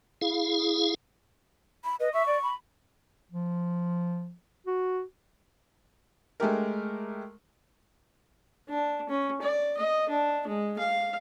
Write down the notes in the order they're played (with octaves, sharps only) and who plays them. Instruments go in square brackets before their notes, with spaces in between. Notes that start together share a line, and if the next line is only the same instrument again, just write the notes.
[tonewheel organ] E4 G#4 F5
[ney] B5
[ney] B4 [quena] D#5
[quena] E5 [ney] C#6
[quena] D5
B5
[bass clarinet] F3
F#4
[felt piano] G#3 A3 G4 A#4
[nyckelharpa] D4
C#4
D5
D#5
D4
G#3
F5